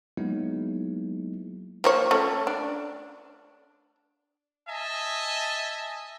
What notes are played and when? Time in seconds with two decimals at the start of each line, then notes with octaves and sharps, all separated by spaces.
0.17 F#3 G#3 A#3 B3 D#4 E4
1.84 F3 A#3 C#5
2.11 A3 C#4
2.47 D4
4.68 D#5 E5 G#5 A5